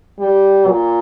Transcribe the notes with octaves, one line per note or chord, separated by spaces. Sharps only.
G3
A#2